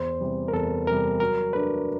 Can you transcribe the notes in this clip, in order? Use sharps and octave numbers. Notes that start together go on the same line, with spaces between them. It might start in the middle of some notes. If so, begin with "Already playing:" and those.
Already playing: E2 C5
C3 E3 G3
A#4
E2 A4
C3 E3 G3 A#4
F#3 A#4
A3 D4 B4